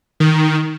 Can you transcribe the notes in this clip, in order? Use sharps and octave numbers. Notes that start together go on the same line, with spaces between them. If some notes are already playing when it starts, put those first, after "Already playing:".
D#3